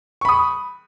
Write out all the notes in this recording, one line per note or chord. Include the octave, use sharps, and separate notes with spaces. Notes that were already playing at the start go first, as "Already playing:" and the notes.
B5 C#6 D#6